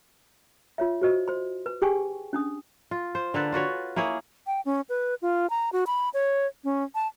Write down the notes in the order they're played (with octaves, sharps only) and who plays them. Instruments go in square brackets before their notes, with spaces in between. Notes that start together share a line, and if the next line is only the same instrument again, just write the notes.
[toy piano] F4 C#5 E5
F#4 C5 D#5
C5 C6
B4
G4 G#4 G5 G#5 C#6
C#4 D4 D#6
[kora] F4
C5
D3 A#3 A4 B4
F4 F#4 B4 C#5
A#3 E4 G#4 C#5
[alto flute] G5
C#4
B4
F4
A#5
F#4
B5
C#5
C#4
A5